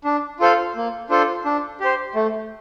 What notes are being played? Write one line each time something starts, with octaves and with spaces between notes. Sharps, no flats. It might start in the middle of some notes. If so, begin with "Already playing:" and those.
D4
F4 A4 C5 F5
A#3
D4 F4 A4 C5
D4
G4 C5
A3